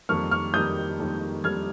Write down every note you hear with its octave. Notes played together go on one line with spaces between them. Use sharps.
F2 D#3 G3 A#3 C#6 F6
C#6 F6
F2 D#3 G3 A#3 D#6 G6
F2 D#3 G3 A#3
F2 D#3 G3 A#3 F6 G#6